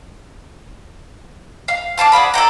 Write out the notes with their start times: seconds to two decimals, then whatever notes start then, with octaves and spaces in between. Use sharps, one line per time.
1.68 F5
1.97 D4 F5 A5 F6
2.12 G#4 D5 F#5 B5
2.34 A4 D5 G5 A#5